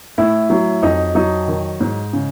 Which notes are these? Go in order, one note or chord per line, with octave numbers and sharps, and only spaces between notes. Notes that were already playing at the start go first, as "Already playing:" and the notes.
A2 E4
F#3
F2 D#4
F#3 D#4
D#3
G#2
C#3